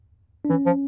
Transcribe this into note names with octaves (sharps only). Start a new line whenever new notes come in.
D4
E3 C#4
F3